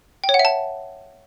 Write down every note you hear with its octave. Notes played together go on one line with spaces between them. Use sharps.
G5
C#5
F#5
E5
A5